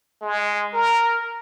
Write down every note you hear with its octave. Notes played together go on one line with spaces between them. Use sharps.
G#3
A#4